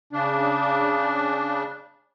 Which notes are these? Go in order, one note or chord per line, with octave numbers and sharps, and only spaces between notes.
C#3 D4